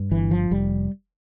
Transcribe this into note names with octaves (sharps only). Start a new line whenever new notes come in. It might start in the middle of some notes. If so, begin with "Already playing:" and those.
Already playing: G2
G1 E3
F3
F1 G3